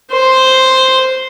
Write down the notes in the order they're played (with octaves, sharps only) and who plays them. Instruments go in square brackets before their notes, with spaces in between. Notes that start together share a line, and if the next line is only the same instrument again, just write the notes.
[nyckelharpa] C5